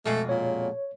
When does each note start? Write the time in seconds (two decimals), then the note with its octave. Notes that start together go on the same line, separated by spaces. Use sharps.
0.05 F2 B2 G#3 A3
0.29 A#2 C#5